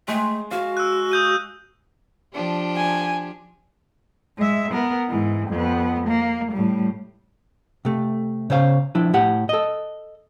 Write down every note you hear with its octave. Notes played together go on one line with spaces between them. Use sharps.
G#3 A3
F#4 F5
E6 F#6
D#6 G6 D#7
F3 D4 G4
G#5
G#3 E5
B3 A#4
G#2 E3
F2 B3
A#3
A2 G3
C3 A3
C#3 C#4 C5 F5
F3 D4 E4
A2 G4 F#5
A4 D#5